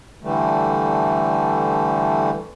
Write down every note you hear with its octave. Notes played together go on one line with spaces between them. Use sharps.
D3 E3 G3 A3